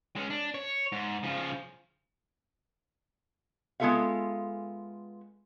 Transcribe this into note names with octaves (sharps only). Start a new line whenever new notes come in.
G#3 C#4
D4
C#5
G#2
C#3 F3
G#3 B3 F4 A4 E5 F5